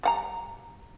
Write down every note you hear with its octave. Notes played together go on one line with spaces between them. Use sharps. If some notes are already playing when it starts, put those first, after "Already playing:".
G3 F#5 A#5